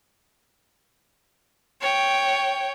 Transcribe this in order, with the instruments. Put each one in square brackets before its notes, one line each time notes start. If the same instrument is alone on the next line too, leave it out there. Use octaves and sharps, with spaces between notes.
[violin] C#5 G5